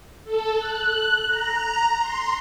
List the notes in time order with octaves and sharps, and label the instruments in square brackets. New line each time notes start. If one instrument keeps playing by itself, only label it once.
[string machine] A4
F#6
A#5
C6